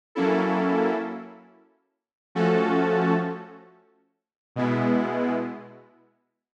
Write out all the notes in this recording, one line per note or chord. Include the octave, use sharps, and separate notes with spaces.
F#3 A#3 C#4 E4 A4
F3 A3 C#4 F#4 A4
B2 G#3 B3 E4